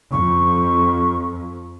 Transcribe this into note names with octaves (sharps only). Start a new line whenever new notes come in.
F2 C#6